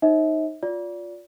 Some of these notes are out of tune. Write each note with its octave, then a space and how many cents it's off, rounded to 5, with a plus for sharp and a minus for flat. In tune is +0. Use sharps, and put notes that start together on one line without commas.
D#4 +0 C#5 -45 E5 -45
F4 +15 D5 -25